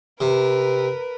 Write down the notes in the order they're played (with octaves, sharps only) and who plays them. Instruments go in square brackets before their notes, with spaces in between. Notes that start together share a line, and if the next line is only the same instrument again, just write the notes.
[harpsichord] C3 [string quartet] A#4 B4